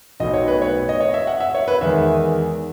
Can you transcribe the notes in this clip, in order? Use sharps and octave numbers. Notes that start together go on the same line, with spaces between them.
B1 B2 A3 D#5
C#5
B4
C#5
D#5
C#5
E5
F#5
E5
C#5
B4
E2 D#3 G#3 E5